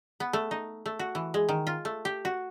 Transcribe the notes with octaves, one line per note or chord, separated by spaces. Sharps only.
B3
A3
D#4
A3
F#4
E3
G#3
D#3
F4
A3
G4
F#4